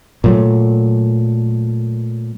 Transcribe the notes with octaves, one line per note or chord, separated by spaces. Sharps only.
A#2 F#3 A3